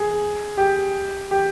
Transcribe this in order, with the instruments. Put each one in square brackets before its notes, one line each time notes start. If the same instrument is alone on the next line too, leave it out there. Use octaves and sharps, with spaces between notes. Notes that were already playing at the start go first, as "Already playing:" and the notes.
Already playing: [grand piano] G#4
G4
G4